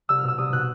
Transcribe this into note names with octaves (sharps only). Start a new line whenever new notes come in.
C2 E6
F6
B2
E6
C2 D#6
B2 F#6